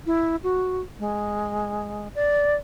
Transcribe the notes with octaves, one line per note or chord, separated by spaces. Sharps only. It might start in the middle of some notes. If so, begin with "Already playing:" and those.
E4
F#4
G#3
D5